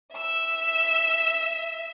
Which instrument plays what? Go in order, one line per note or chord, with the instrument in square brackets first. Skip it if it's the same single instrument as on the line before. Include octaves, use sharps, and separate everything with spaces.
[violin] E5 E6